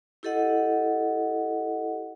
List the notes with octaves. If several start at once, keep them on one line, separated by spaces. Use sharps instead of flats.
E4 G4 A4 D#5 F#5